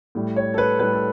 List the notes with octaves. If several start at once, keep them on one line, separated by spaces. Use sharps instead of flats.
A2 G3
C#5
A4
B4
A2 G3 B4
A4